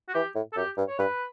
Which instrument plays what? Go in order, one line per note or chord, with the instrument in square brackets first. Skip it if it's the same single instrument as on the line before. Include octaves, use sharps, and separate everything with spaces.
[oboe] F#4
[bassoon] E3 [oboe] G4
[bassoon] A2
[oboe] A4
[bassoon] F#2 [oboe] G4
[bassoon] G2
[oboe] C#5
[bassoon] G2 [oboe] B4